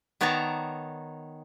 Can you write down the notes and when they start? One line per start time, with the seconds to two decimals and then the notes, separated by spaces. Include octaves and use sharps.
0.21 D#3 B3 C#5 D5 A5 A#5